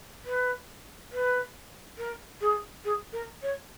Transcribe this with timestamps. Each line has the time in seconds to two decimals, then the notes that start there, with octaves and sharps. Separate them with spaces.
0.24 B4
1.11 B4
1.97 A#4
2.40 G#4
2.84 G#4
3.12 A#4
3.42 C#5